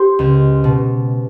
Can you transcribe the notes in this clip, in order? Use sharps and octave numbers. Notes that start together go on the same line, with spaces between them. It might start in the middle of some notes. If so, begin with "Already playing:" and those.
Already playing: G4 C5
C#2
B2